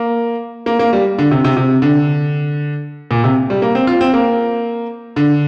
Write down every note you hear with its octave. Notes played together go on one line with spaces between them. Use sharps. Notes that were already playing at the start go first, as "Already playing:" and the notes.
Already playing: A#3
A#3
A#3
G3
D3
C3
C3
C3
D3
A#2
C3
G3
A#3
C4
F4
C4
A#3
D3